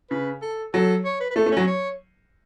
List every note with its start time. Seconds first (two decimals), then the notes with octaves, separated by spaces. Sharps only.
0.10 C#3 B4
0.42 A4
0.74 F#3 A4
1.05 C#5
1.20 B4
1.31 B4
1.36 A3 A4
1.46 A3
1.52 C#4
1.57 F#3
1.67 C#5